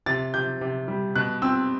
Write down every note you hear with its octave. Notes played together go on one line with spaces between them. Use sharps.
C3 A6
C3 G6
C3
G3
B2 F#6
C4 E6